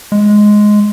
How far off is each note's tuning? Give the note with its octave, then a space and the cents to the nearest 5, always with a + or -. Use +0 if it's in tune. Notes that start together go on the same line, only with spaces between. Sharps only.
G#3 +5